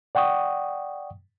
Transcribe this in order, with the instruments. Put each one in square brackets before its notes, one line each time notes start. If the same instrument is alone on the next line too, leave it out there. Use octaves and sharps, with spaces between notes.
[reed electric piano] D5 F#5 G5 C#6 D#6